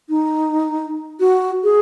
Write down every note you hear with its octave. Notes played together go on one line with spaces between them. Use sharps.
D#4
F#4
G#4